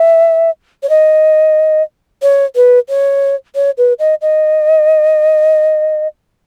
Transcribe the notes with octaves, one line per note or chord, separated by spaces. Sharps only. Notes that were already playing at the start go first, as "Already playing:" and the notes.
Already playing: E5
C#5
D#5
C#5
B4
C#5
C#5
B4
D#5
D#5